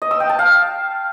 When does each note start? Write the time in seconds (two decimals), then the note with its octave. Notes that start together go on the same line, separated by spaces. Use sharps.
0.02 D#5
0.11 E6
0.20 G5
0.29 A5
0.39 F5